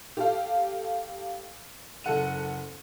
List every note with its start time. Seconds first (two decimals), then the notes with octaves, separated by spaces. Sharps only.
0.17 G4 A4 F5
2.04 F#1 A4 F#5 D#7